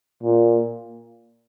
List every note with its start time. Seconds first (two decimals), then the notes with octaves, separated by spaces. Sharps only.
0.23 A#2